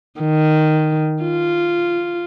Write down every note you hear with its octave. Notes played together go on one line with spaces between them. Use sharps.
D#3
F4